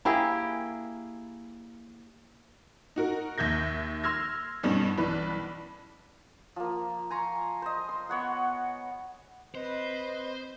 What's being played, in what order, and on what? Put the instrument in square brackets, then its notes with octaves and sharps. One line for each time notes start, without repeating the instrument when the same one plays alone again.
[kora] A#3 E4 G4 G#4
[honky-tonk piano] D#4 F#4 A#4
D#2 E5 G6 G#6 A#6
C6 E6 F6 G#6 A#6
G2 B2 G3 B3 C#4 D#4
B1 E3 B4 D5
[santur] F3 A#3
G#5 A#5 C6 C#6
C5 D#5
C6
B3 C#5 F#5
[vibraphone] C4 [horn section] B4 [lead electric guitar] C5 [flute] D#5